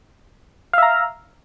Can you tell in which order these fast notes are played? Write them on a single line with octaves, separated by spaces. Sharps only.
F5 E5 A#5